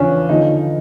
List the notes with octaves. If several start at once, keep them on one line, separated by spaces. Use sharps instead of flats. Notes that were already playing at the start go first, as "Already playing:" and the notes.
Already playing: E2 C#3 F3 C#4 D4
D3 F3 D#4